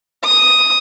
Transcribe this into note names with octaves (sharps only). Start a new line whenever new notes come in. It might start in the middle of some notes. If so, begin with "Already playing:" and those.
D#6